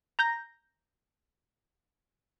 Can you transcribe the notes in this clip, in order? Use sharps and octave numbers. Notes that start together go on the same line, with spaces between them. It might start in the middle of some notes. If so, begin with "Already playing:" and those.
A#5 G6 A#6